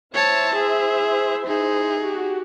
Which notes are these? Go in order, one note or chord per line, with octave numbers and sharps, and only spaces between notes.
E4 C5 C#5 E5 A5
G#4
D#4 G#4
F#4 G4